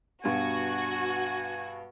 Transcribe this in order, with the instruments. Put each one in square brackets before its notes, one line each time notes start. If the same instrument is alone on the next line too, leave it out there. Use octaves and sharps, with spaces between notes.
[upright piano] G2 B2 [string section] F#4 [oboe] G#5